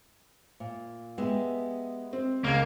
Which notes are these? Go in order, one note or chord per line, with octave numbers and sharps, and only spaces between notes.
A#2
G#3 B3 G4 E5
C4
C#2 A#3 G#6